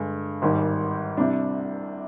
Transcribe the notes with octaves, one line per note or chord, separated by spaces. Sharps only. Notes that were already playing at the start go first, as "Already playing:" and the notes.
Already playing: G2 D3 G#3
G#1 G#2 D#3 G3
C2 C3 G3 D4